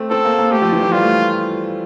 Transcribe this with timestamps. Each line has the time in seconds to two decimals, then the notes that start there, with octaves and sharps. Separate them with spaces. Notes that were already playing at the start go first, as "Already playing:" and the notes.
Already playing: A3 C4
0.10 C4 A4
0.25 A#3
0.38 A#3
0.52 A3 G4
0.62 F3
0.72 E3
0.82 F3
0.92 G3 F4
1.03 A3